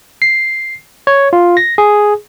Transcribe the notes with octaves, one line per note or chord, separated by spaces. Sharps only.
C7
C#5
F4
A#6
G#4